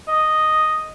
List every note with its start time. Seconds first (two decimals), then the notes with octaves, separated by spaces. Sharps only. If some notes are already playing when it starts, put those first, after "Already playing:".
0.08 D#5